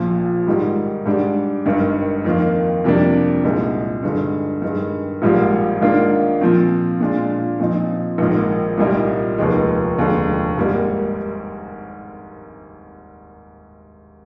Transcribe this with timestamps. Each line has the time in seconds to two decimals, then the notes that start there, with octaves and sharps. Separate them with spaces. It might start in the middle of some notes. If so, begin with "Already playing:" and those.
Already playing: A#1 A#2 F3
0.47 G#2 D#3 G3
1.06 G#2 G3 D4
1.66 G#1 G2 D#3
2.25 F2 D#3 A#3 F4
2.84 F2 C3 G3 A#3 D4
3.44 C2 A#2 G#3 D#4
4.03 G2 D3 G#3 D#4
4.62 G2 D#3 G#3
5.22 A#1 G#2 G3 A#3 F4
5.81 G#2 D#3 A#3 D4 F4
6.41 A#2 F3 C4 F4
7.00 A#2 G#3 D4 F4
7.59 A#2 F3 C4 D#4
8.18 A#1 G#2 D#3 A#3
8.78 C2 A#2 G3 A#3 D#4
9.38 F1 D#2 D#3 G#3
9.98 F1 D#2 D3 G#3
10.57 G#1 G#2 G3 A#3